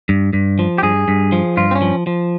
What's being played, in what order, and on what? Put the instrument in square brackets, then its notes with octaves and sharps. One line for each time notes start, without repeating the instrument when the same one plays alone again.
[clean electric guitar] G2
G2
F3
G4
G2 G#4
G2
F3
G2 F4
C4
C#4
F3
F3